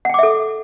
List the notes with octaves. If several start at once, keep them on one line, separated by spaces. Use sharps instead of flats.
A4 E5 F#5 G5 D6